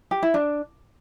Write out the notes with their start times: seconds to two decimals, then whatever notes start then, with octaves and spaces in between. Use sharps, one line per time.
0.11 G4
0.23 E4
0.34 D4